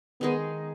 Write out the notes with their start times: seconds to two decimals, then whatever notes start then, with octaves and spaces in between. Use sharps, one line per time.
0.21 D#3 G#3 B3 D#4 G#4